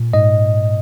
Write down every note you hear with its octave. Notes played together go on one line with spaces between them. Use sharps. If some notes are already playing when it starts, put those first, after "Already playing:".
Already playing: A#2
G#2 D#5